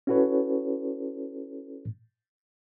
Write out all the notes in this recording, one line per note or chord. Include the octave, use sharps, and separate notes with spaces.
C#4 E4 F#4 A4 B4 C#5